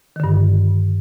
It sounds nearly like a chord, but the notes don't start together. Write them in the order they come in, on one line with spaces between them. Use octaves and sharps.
D#3 D3 G2